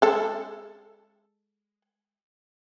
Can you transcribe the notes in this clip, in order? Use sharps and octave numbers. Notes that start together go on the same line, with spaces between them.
G#3 A4